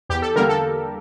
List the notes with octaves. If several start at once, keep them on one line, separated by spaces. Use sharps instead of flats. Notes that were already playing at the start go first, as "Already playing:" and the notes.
E2 G4
A4
D3 G3 A#3 A#4
A4